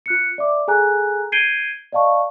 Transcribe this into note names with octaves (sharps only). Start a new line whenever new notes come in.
F4 F#6 C#7
D5 E5 D6
G#4 A4 G#5 A#5 F#6
G6 G#6 C7 D7 D#7 G7
D5 D#5 F5 A5 C#6